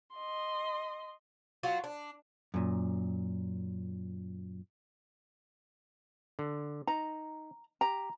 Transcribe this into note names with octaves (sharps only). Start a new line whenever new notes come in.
D#5 C6
F#3 F4 F#4
D4
F#2 A#2
D3
D#4 A#5
G4 A#5